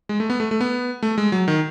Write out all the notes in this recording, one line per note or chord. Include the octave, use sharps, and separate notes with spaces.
G#3
A3
B3
A3
A3
B3
A3
G#3
F#3
D#3